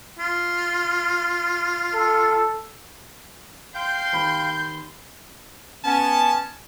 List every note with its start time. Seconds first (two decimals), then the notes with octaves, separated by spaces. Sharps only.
0.20 F4
1.94 A4
3.75 F5 G5 C6 G6
4.13 D#2 B5
5.85 B3 C#4 A5